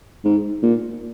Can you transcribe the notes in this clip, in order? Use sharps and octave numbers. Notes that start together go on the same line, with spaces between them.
G#2
A#2